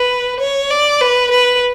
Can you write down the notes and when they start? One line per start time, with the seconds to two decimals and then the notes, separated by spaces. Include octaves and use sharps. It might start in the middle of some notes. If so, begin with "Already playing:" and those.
Already playing: B4
0.40 C#5
0.71 D5
1.01 B4
1.31 B4